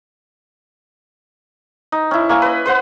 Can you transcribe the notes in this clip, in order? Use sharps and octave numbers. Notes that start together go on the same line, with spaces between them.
D#4
C#4 E4
A#3 G#5 C#6
B4 D#5
B4 C5 F#5